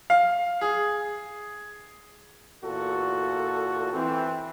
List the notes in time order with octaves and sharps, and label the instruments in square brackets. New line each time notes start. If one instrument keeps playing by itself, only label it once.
[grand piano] F5
G#4
[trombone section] E2 A#2 F#4 A4
E3 C4